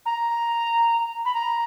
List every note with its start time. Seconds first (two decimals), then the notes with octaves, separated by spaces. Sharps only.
0.05 A#5
1.25 B5
1.33 A#5